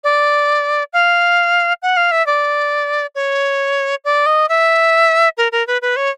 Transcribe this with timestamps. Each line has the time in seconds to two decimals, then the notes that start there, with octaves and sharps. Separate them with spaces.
0.04 D5
0.93 F5
1.82 F#5
1.97 F5
2.11 E5
2.27 D5
3.15 C#5
4.05 D5
4.26 D#5
4.49 E5
5.37 A#4
5.52 A#4
5.67 B4
5.82 B4
5.96 C#5